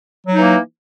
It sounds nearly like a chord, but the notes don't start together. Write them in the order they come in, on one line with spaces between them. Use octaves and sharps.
F#3 D#4 E3 A#3